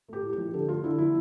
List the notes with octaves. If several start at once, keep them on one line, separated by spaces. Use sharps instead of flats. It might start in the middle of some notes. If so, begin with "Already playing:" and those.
A3 G4
A2
G4
F3
D3 A4
A3 F4
D3 E4
F3 E4